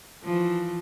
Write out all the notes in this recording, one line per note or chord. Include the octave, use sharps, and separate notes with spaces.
E3 F3